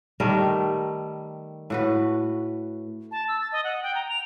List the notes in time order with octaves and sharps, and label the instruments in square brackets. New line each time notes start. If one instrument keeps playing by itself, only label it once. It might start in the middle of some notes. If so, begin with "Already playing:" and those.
[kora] D#3 G3 A3 A#4
A2 F#4 B4
[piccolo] A5
E6
A6
D#5
F#5
G5
A#5
F7